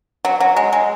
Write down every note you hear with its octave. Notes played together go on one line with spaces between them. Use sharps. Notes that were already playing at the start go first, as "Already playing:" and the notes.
F#3
F#3
G#3
G#3